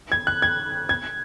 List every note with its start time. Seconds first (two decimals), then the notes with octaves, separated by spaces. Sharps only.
0.12 G#6
0.27 F#6
0.42 G#6
0.89 G#6